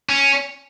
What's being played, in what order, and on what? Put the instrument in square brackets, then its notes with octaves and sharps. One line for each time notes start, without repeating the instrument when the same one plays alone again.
[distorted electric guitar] C#4